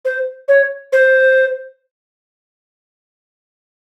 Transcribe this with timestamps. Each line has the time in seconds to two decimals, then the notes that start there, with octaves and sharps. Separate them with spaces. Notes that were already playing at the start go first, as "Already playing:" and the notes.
0.05 C5
0.48 C#5
0.93 C5